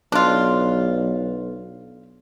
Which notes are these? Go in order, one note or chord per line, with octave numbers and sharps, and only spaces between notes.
B1 D4 F4